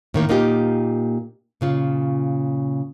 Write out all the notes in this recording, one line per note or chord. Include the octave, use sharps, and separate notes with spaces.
A2 D#3 A#3
A#2 A#3 D#4 F4 G4
A#2 C#3 F4